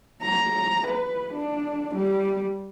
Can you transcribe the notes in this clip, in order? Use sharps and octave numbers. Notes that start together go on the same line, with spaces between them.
A#5
B4
D4
G3